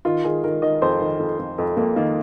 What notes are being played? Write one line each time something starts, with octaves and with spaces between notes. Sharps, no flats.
D#3 F4
D#3 G#4
D#3 A#4
D#3 D#5
F2 C5
D#3
F2
F2
F2
F2 A#3
D#3 A#3